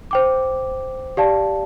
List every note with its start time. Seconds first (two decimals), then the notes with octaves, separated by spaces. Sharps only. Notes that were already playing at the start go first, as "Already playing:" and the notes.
0.11 C5 G5 D6
1.17 G4 D5 F5 A5